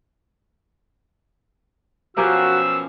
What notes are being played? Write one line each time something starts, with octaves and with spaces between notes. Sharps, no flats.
F#2 B2 F3 C#4 F#4 G4 A#4 E6